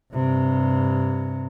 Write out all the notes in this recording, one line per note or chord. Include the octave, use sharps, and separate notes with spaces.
G2 C3